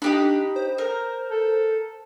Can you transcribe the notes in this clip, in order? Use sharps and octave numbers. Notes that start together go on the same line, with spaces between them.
D4 D#4 G4 B5
C5
A#4
A4